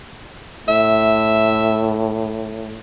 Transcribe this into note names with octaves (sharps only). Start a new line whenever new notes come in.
A2 E5